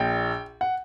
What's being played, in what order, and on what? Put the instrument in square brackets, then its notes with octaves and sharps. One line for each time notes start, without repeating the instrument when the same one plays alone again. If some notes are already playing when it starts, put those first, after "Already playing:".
Already playing: [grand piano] A#1 A#2 G5
F#5